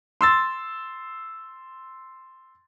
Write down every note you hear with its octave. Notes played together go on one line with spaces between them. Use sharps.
C6 E6 A6